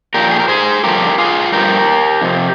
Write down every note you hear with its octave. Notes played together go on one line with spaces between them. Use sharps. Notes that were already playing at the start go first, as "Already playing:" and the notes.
A#2 F3 G4 A#4
G#4
A#4
G#4 C5
G2 D3 F3 G4 A#4
F4 G#4
G2 F3 G4 A#4
F2 C3